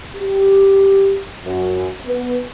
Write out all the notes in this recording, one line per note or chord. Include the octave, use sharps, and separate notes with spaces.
G4
F#2
B3